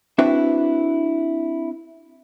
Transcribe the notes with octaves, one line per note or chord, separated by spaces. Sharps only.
C4 D4 E4 F#4 B4 E5